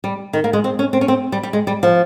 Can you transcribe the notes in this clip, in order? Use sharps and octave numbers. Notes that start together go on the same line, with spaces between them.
G3
D#3
A#3
G#3
C4
C#4
C4
C#4
C4
G3
G3
G#3
G3
F3